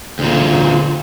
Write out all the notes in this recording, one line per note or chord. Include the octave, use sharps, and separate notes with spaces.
D2 A#2